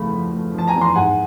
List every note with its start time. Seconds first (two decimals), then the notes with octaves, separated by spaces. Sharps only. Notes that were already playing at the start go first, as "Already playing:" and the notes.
Already playing: E2 C#3 F3 A3 B5
0.13 F3
0.34 A3
0.54 F3 A5
0.68 G#5 A#5
0.76 E2
0.81 A#5 C6
0.95 G#2 F#5 G#5